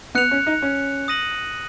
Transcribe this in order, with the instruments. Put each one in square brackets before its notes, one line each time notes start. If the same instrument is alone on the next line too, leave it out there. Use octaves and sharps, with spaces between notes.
[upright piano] B3 [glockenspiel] F#6 C#7 F7
[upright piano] C#4
D#4
C#4
[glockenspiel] D#6 A#6 D#7 F#7